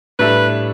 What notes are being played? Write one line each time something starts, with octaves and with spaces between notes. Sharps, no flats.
A2 G3 D4 A4 B4 E5